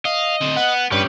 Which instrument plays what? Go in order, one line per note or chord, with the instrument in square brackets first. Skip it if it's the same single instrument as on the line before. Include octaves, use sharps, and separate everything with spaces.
[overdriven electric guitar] D#5 [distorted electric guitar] F5
[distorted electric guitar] D2 C4
[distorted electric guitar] B3 [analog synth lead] F#5
[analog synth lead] G2 [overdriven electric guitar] C#4 G4 [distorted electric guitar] B4